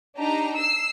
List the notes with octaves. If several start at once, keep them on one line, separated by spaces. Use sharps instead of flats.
D4 D#4 G4 A#5
E6 C7